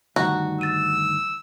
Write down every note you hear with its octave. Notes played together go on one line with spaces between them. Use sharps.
D2 G2 D#3 F#4 F#5 A#5
E6 A6 D#7